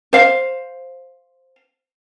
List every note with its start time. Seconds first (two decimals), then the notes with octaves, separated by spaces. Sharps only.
0.13 C5 F5